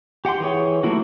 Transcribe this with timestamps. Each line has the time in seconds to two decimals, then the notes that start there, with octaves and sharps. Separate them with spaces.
0.25 G4 F#5 G5 C6
0.40 E3 G#4 C#5
0.83 F#3 A3 A#3 E4 F#4